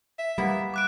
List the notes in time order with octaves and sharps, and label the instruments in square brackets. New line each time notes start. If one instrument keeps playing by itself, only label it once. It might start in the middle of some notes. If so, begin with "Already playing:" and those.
[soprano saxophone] E5
[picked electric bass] G3 [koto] A#3 B3 E4
[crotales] D6 F#6 D7